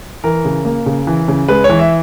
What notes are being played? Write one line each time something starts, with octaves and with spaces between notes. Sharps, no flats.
E3 A#4
C#3
A#3
C#3
E3
C#3
G#3 B4
C#5
E3
E5